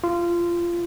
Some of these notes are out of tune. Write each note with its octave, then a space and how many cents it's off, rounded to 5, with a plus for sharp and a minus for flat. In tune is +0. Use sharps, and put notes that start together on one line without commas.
F4 -20